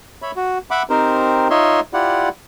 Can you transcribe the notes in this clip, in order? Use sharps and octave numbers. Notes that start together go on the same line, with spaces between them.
C#5 E5 B5
F#4
E5 F#5 B5 D6
C4 D#4 G4 A#4 C5
D#4 F4 C#5 D#5 E5 C6
E4 F4 G4 D5 F#5